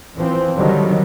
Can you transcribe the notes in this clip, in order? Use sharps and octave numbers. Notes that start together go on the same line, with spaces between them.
E3 F3 C4
D3 D#3 F#3 G3